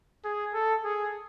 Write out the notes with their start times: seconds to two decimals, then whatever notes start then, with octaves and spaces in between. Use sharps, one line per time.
0.25 G#4
0.54 A4
0.84 G#4